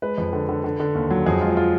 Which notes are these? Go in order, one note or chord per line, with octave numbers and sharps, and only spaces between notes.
G#3 B4
F2
D3
D3
D3
D3
D#2
F#3
F2 G#4
G#3 F4
F4